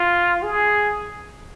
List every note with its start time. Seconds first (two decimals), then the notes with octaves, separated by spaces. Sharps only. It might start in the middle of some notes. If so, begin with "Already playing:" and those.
Already playing: F4
0.43 G#4